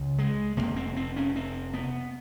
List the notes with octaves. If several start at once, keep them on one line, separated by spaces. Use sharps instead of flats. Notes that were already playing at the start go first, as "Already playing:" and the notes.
Already playing: C#2 C#3
G#3
F1 E2 C3 A#3
C4
C4
C#4
C4
B3